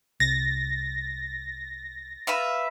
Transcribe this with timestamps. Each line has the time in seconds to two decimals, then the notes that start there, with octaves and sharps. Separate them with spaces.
0.20 C2 A6 A#6
2.27 B4 E5 F5